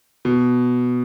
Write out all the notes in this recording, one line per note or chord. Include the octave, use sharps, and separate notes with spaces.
B2